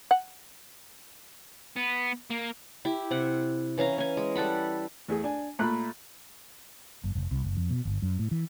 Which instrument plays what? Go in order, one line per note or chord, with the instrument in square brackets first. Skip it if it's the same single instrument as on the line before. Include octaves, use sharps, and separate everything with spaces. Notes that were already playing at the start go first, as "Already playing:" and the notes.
[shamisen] F#5
[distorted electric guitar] B3
A#3
[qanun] E4 G4
C3 F#5
E3 C#4 F5 A#5
C#4 G#5
G#3
G3 A4 F#5 B5
[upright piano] E2 A3 G#4
D4 G#5
[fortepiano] A#2 A3 F#6 [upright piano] A#5 B5
[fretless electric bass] F#1
F1
C2
F#1
F2
B2
G1
F#2
A2
E3